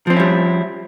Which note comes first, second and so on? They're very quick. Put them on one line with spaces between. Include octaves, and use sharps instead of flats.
F3 C4 C#4 E4 G3